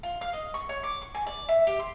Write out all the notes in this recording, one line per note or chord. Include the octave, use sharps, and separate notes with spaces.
F4
F5
D#5
C#6
C#5
D6
C#6
G#5
D5
E5
G4
C6